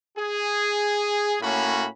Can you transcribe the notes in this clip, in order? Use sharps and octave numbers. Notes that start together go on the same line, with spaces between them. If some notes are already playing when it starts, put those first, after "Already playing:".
G#4
A2 A#3 C#4 F#4 B5